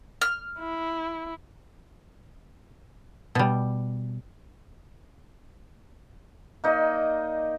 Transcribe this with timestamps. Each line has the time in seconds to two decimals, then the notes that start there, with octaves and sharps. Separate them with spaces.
0.22 F6
0.59 E4
3.35 B2 G3
6.64 A#3 D#4 D5 D#5